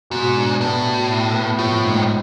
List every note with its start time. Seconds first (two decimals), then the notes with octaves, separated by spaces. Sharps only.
0.10 G#2 B2
0.36 D4
0.60 A2 B3
0.85 B2
1.10 E4
1.34 B3
1.59 A2 F3
1.84 G#2